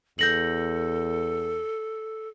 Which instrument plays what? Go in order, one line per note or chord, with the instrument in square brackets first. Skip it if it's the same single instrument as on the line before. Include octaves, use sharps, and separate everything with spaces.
[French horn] E2 [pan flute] A4 [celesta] G6 A#6 F#7